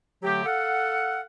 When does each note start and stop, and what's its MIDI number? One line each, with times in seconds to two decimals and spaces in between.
0.23 0.45 50
0.23 0.45 54
0.23 0.45 57
0.23 0.45 67
0.46 1.22 69
0.46 1.22 77
0.46 1.22 78